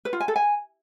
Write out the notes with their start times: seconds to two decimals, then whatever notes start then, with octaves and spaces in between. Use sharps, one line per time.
0.05 B4
0.13 F4
0.20 G#5
0.28 A4
0.36 G#5